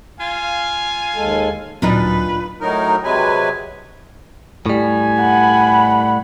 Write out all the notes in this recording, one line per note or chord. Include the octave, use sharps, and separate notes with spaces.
F4 F5 G#5
D#2 G#3 A4
D1 A#2 F#3 C4 D4 D#4 B4
A2 F#3 D#4 A#4
C3 F#3 G#3 B4 G#5
A2 G3 G#5
F#5 B5